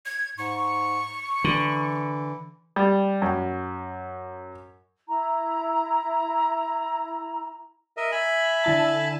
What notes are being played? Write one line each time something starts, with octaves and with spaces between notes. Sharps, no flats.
G#6
G#2 C#6
D3 E3
G3
F#2
E4 A#5
A#4 D#5 E5
E5 G#5 B5
D3 E4 A5